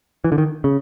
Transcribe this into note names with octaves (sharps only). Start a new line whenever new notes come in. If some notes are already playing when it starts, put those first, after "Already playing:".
E3
D3
D#3
C#3